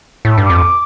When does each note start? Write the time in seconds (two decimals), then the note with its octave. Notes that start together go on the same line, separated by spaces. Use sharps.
0.25 A2 E6
0.38 G2
0.44 D6
0.50 F2